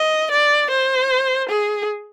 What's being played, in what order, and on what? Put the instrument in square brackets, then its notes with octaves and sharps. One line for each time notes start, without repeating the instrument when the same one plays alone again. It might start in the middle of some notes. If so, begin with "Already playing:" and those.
Already playing: [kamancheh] D#5
D5
C5
G#4